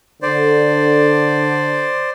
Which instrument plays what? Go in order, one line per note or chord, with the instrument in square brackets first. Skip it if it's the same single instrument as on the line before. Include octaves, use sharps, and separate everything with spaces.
[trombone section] D3 [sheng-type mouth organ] C5 D5